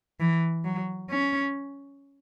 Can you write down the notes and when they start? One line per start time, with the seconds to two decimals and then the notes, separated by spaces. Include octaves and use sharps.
0.20 E3
0.65 F#3
1.10 C#4